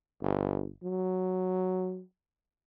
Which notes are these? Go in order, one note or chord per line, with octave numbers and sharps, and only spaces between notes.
G1
F#3